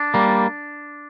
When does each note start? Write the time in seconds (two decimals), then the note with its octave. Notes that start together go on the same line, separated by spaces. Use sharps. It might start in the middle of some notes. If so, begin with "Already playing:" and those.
Already playing: D4
0.14 G3 A#3